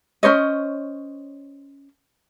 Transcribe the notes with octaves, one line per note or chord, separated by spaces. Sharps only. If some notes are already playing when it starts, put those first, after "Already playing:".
C#4 C5 C#5 D#5